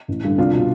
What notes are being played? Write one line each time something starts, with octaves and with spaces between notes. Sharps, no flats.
A1
G2 D3
C2 D4 F4
B2